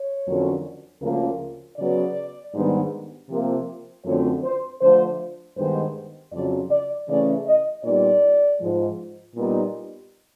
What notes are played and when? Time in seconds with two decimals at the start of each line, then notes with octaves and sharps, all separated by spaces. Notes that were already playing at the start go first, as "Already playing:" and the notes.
Already playing: C#5
0.26 F2 D3 F#3 A#3 C#4
1.02 D2 C#3 F3 A#3
1.77 C#3 F#3 B3 D5
2.53 G#2 D#3 G3 B3 D4
3.29 C3 F3 A#3
4.05 F#2 D3 F3 A3 C4 C#5
4.43 C5
4.81 D3 F3 A3 C5
5.56 G2 D#3 G#3 B3 C5
6.32 F2 C#3 F#3 D5
6.70 D5
7.08 C#3 E3 A3 C#4 D5
7.46 D#5
7.84 A#2 G3 B3 D#4 D5
8.60 G#2 F3 G#3
9.35 A#2 G3 B3 D#4